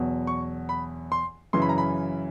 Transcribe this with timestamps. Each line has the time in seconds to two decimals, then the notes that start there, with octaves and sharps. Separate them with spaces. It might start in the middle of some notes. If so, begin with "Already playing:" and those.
Already playing: E2 B2 F#3
0.27 C#6
0.69 B5
1.12 C6
1.53 F#2 C#3 E3 C6
1.62 B5
1.69 A#5
1.78 B5